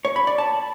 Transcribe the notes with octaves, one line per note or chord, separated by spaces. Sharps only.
C#5
B5
D5
A5